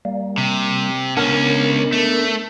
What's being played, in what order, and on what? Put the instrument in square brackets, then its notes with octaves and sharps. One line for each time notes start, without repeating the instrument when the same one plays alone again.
[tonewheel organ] G3 A#3
[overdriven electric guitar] C3
[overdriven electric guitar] C#2 C#4 [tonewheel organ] B3 D4 A#4
[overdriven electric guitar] A3